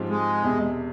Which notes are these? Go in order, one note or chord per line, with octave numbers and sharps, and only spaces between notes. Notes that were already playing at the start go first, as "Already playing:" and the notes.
Already playing: G#2 F3 C4 G4
G#3
E1 E2 C3